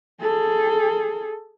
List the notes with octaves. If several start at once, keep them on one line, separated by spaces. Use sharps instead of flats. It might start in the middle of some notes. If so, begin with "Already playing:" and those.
G#4 A4